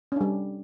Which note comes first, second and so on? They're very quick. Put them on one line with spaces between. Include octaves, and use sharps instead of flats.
C#4 D4 G3